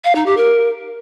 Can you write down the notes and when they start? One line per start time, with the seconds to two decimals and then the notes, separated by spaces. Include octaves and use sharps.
0.04 F5
0.15 D#4
0.26 G4
0.37 A#4